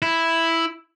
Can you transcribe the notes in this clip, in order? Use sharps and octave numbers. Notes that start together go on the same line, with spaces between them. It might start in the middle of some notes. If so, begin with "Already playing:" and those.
E4